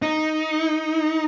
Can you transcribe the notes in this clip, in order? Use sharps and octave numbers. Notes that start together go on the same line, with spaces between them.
D#4